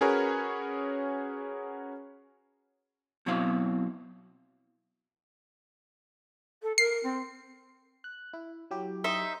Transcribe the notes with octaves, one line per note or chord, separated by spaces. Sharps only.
C#4 F#4 G#4 A#4 B4 C#5
B2 F#3 C4 E4 F5
A4
A#4 C7
C4
F#6
E4
F#3 E4 G4
D#4 C5 E5